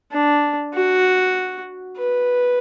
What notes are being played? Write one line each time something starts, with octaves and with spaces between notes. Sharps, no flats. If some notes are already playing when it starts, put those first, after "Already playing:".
D4
F#4
B4